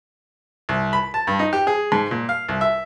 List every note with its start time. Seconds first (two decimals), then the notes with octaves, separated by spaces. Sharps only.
0.69 C2
0.93 B5
1.14 A5
1.27 G2
1.39 D#4
1.53 G4
1.67 G#4
1.92 G#2
2.11 A#2
2.29 F5
2.49 C2
2.61 E5